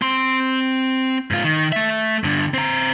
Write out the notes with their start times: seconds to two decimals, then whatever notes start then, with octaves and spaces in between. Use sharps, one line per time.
0.02 C4 C6
1.31 G#2 F4
1.44 D#3
1.72 A3 E5
2.24 G2 D3
2.54 C4 A#5